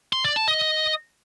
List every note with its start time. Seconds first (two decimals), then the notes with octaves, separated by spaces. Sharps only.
0.13 C6
0.24 D5
0.36 A5
0.48 D#5